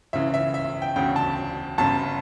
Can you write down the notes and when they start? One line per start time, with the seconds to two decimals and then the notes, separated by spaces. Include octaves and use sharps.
0.13 C#2 C#3 E3 E5
0.34 E5
0.54 E5
0.82 G5
0.96 E1 D2 C#3 G5
1.16 A5
1.78 G1 F#2 C#3 A5